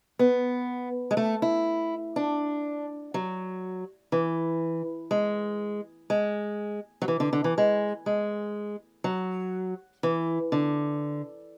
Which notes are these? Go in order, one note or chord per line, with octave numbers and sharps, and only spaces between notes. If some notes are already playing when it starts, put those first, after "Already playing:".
B3
G#3
A3
E4
D4
F#3
E3
G#3
G#3
F#3
E3
D3
D3
E3
G#3
G#3
F#3
E3
D3